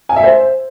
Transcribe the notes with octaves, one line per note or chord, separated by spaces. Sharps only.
G#5
E5
C5